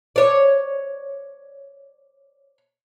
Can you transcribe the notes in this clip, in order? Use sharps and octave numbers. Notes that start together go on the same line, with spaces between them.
C#5 D5